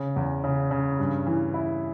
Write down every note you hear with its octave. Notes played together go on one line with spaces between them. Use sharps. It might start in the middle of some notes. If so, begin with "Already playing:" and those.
Already playing: C#3
E2
C#3
C#3
G2
E3
E4